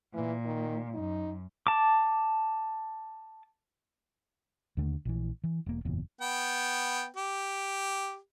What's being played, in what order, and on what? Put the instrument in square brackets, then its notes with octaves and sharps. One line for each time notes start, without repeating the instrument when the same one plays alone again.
[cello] A#2 [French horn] E3
[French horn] D#3
[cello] F#2 [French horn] D#4
[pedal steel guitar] A5 D6
[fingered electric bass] D#2 D3 A3
A#1 E3
E3
E1 A#3
F#1 E2 A#2
[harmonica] B3 G5
G4